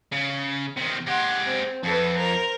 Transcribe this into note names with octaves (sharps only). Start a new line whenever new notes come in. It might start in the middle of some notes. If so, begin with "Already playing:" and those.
C#3
C3 D#3
G#3 G4 F#5 C6
C4
F2 A4 B4
A#4 C5